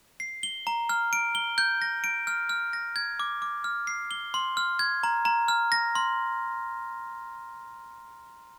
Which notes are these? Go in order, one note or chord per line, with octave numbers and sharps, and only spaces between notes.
C7
G7
A#5
F6
D7
G7
G6
A#6
D7
F6
F6
A#6
G#6
D6
D6
F6
C7
G7
C6
F6
G#6
A#5
A#5
F6
A#6
C6